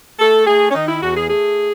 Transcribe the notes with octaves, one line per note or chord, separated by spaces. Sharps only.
A3 A4
A3 G#4
C#4
D#3 D#4
E4
E2 F#4
G#4
A3 G#4